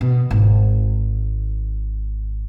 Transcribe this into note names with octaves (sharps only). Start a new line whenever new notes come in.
B2
G#1